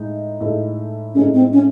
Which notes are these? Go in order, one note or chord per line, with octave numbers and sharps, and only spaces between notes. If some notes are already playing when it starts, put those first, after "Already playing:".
Already playing: A2 G#3 D#4
A2 G#3 D#4 A4
A2 G#3 C#4 D#4 A4
C4
C#4